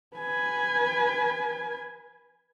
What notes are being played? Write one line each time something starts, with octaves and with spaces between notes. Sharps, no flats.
B4 G#5